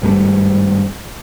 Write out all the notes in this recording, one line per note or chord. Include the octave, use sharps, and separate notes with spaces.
G#1 G2 G3 A3